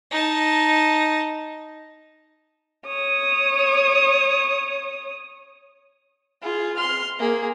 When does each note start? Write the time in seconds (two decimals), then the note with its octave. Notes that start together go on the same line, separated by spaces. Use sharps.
0.11 D#4 A5
2.86 C#5 D#6
6.42 F4 G#4
6.77 C6 F6
7.19 A#3 G#4